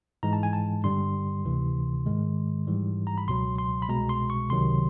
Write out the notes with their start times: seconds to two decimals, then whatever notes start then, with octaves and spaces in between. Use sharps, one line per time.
0.23 G#2 E3 G#3 A#5
0.33 A5
0.43 G#5
0.53 A5
0.84 G2 D3 G3 C6
1.45 D2 C3 E3
2.06 G#2 D#3 G#3
2.67 G#2 E3 G3
3.07 A#5
3.18 B5
3.28 C#2 B2 F#3 C6
3.58 C6
3.82 B5
3.89 C2 B2 G#3 A#5
4.09 C6
4.30 C#6
4.50 C#2 C3 D#3 F#3 C6